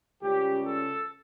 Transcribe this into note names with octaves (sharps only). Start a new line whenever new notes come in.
C#2 C#3 G3 G4
A4